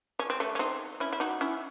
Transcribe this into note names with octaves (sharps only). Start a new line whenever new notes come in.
C#4
C4
A3 C#4
C#4
C4 D#4
C#4 E4
E4
D#4 F#4
C#4 E4